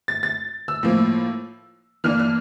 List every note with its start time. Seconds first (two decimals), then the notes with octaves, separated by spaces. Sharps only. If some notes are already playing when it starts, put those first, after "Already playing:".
0.08 A6
0.23 A6
0.68 E6
0.83 A2 F3 A#3
2.04 E3 A#3 D4 F6
2.20 F6